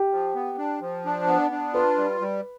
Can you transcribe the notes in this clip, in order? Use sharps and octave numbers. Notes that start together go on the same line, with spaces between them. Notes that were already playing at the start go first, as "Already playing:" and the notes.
Already playing: G4
F3
B3
D4
F3
D4
B3
D4
F4 B4
G3
G3